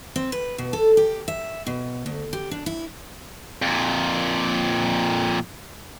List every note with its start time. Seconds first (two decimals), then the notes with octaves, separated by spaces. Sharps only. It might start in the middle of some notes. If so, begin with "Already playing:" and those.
0.16 C4
0.32 B4
0.58 B2
0.73 A4
0.97 G4
1.28 E5
1.67 B2
2.06 D2
2.33 G4
2.51 D4
2.66 E4
3.62 F2 A#2